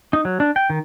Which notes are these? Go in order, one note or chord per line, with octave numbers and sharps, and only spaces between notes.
D#4
F#3
D4
G5
D#3